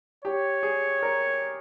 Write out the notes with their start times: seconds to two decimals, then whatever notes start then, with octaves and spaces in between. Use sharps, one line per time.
0.25 G4 C#5
0.63 G#4
1.03 A#4